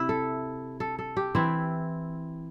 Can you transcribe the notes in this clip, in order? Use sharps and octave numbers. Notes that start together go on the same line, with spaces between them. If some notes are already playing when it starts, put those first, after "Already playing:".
Already playing: C3 C4 E4 E5
A4
A4
A4
G4
E3 C4 E4